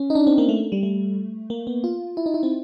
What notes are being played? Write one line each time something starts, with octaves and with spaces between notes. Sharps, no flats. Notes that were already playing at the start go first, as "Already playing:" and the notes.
Already playing: C#4
D#4
D4
C4
A#3
A3
G3
A3
A#3
B3
F4
E4
D#4
E4
C4